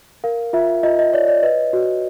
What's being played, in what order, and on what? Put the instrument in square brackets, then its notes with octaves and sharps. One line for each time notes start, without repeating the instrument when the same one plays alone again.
[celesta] A#4 F5
F4 E5
F4 D#5
D#5
C#5 D5
D5
B4 D#5
F#4